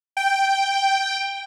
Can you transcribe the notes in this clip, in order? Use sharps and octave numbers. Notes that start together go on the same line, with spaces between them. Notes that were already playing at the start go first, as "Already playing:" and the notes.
G5